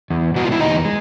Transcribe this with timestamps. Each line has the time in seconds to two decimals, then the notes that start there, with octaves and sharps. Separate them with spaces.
0.10 E2
0.35 B2 G#3 F#4
0.45 F4
0.52 E4
0.60 E2 D#4
0.85 G#3